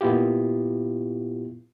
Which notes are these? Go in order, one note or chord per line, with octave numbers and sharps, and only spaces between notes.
A#2 B3 E4 F4 G4